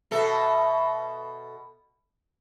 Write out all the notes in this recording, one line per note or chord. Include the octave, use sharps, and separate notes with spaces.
B2 A4 E5